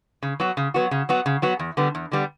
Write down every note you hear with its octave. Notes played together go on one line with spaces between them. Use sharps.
C#3
F#3 B3 F#4
C#3
F#3 B3 F#4
C#3
F#3 B3 F#4
C#3
F#3 B3 F#4
E2
D3 G3 B3
E2
D3 G3 B3